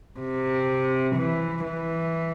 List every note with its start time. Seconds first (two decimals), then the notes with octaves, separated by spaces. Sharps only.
0.20 C3
1.16 E3
1.64 E3